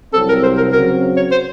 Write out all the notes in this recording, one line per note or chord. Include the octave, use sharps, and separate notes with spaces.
C2 C3 F#3 C4 A4
A#4
C5
A#4
C#3 F#3 C4 F#4 A#4
C#5
C5